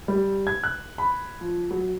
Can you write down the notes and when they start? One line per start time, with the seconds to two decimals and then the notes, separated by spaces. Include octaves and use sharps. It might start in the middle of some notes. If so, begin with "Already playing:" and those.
0.08 G3
0.47 G#6
0.64 F#6
0.98 B5
1.41 F3
1.71 F#3